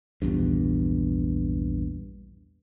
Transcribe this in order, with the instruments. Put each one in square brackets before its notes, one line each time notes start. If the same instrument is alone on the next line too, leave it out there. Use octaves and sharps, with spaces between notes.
[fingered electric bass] A#1 E2 G2